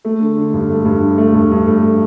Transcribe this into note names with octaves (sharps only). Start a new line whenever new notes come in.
A3
D3
D3
G2
A3
G2
D3
A3
G2
G2
A3